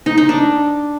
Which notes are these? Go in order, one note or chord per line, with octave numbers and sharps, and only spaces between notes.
D#4
D#4
D4